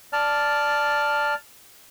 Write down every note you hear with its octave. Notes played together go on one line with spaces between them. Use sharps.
D5 A5 F6